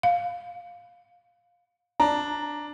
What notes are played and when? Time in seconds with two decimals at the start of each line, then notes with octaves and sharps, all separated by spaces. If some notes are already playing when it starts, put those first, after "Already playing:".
0.03 F5
2.00 D4 A#5